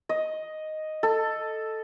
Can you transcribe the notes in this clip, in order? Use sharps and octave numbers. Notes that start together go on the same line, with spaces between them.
D#5
A4